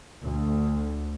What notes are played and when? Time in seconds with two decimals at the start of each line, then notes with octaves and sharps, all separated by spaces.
0.22 D2